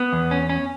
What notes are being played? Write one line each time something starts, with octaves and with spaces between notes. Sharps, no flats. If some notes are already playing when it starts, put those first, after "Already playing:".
Already playing: B3
E2
C#4
C#4